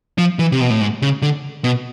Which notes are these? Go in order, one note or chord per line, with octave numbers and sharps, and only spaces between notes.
F3
E3
C3
B2
A2
G#2
C#3
D3
B2